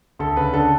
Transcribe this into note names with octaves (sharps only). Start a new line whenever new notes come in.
D2 A4
C#3 B4
D3 A4